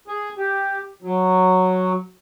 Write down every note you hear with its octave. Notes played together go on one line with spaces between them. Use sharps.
G#4
G4
F#3